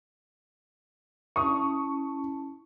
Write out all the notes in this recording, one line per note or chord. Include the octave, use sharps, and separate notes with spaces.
C#4 E4 A5 C#6 D#6